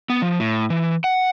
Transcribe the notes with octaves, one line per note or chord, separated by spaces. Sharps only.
B3
F3
A2
E3
F#5